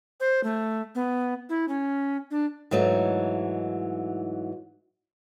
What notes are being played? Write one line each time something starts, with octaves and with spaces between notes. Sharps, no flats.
C5
A3
B3
E4
C#4
D4
G#2 E3 F#3 A3 D#4